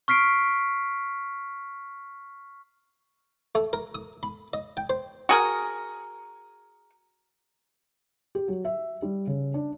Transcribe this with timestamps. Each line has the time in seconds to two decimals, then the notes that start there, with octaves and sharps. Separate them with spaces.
0.08 C#6 F6 B6 C7 D7
3.55 A3
3.73 A#4
3.95 D#6
4.23 B5
4.53 D#5
4.77 G5
4.90 C5
5.29 F#4 G#4 A#4
8.35 G4
8.48 F#3
8.65 E5
9.02 G3
9.27 C#3
9.54 D4